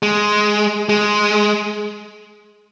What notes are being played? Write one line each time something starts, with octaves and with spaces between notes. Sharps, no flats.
G#3
G#3